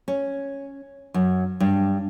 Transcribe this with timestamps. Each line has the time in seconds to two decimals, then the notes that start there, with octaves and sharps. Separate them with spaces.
0.08 C#4
1.14 F#2
1.60 G2